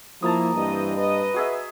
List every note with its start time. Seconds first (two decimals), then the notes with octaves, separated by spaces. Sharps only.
0.22 F3 A#3 E4 A5 A#5 D#6
0.55 G2 E3 C4 D#5
0.97 B4 D#5
1.34 F#4 G#4 E5